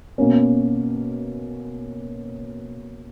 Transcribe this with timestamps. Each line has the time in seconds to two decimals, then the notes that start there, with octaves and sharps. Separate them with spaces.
0.18 B2 A#3 C#4